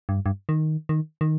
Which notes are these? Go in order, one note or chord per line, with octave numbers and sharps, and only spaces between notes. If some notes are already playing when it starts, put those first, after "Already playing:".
G2
G2
D#3
D#3
D#3